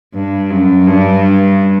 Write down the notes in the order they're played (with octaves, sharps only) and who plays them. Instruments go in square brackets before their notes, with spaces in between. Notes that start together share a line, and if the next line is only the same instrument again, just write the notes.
[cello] G2
F#2
G2